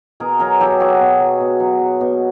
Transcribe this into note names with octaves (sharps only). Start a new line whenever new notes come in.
B2 G#4 A#4
F#3 G#4 A#4
F#3 G4 A4
B2 F#4 G#4
B2
F#3
B2
F#3
F#3
B2